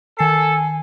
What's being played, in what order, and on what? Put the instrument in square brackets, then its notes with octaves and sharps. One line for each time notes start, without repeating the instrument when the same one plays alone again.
[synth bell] D#3 C7 [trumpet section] A4 [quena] G#5